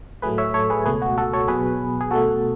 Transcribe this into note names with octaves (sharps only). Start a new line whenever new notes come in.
A2 F#3 A3 G#4 B4
C#5 E5
A4 C#5
G#4 B4
C#2 B2 A3 G#4 B4
F#4
F#4 A4
A4 C#5
B2 F#3 B3 G#4 B4
G#4
B2 A3 F#4 A4